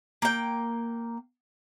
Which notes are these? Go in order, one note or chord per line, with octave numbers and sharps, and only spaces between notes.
A#3 G5